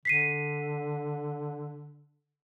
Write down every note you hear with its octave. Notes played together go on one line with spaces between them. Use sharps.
D3 B6 C7 D#7